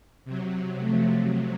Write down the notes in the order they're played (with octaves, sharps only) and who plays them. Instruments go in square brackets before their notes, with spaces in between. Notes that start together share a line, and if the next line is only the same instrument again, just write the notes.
[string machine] C3 F#3
[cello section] F3 A3